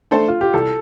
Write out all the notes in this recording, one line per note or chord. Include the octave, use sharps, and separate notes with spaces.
A3 D4 A4 C5
F4
G4
C2 A4